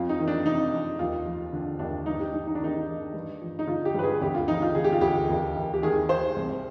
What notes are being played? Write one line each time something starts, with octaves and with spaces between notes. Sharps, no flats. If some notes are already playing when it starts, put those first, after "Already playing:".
Already playing: F2 F4
D#4
D#3
D4
C3 D#4
F2
D#2 F4
F3
D3 D4
D#2 D4
G2 D#4
G4
G2 D#4
D#4
D4
D#3 D#4
D#3
G2
F3
D#4
D3 F4
G4
G2 B4
G#4
D2 G4
F4
F3 D#4
F4
D3 G#4
G4
F4
D2 G4
D#2
D#2
G4
D#3 G#4
D#3 C5
C2